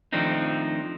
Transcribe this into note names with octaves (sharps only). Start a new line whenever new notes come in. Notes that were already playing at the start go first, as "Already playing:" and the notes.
D#3 F3 A3 C4 D4 D#4